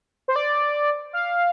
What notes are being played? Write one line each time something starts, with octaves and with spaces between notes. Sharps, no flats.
C5
D5
F5